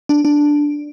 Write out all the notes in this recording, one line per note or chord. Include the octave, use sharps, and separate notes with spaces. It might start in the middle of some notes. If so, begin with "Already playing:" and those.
D4
D4